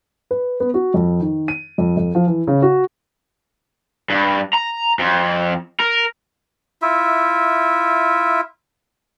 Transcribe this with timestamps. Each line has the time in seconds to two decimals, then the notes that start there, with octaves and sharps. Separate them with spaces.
0.31 B4
0.60 B3
0.74 F#4
0.94 F2
1.20 D#3
1.48 D#7
1.78 F2
1.97 F2
2.15 F3
2.27 E3
2.47 C#3
2.62 F#4
4.10 G2
4.54 A#5
4.99 F2
5.80 A#4
6.82 E4 F4 E5